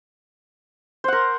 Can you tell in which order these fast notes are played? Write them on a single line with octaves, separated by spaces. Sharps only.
C5 F#5 A#4